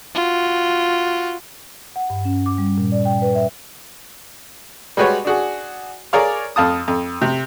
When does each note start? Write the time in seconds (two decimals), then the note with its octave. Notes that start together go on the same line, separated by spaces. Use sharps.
0.15 F4 F#4
1.96 F#5
2.10 G2
2.25 C#4
2.46 D6
2.58 G3
2.78 A#2
2.92 D5
3.05 G5
3.22 B4
3.35 E5
4.97 G3 G#3 F#4 B4 C#5
5.25 D4 F#4 G#4
6.13 G#4 A#4 C#5 D5 F5 C#6
6.56 F2 F5 A5 D#6
6.88 F2
7.22 C3